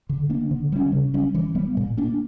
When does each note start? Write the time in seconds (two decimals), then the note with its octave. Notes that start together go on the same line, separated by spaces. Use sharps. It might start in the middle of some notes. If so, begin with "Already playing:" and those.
0.09 D3
0.30 A#3 D4
0.51 D3
0.72 G3 C#4
0.92 C#3
1.14 G3 C#4
1.34 E3
1.55 G3 B3
1.77 A#2
1.97 A#3 D4